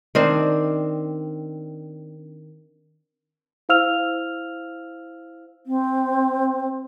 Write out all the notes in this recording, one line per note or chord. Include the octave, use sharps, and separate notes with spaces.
D#3 C4 D4
E4 C5 F5 E6 F6 F7
C4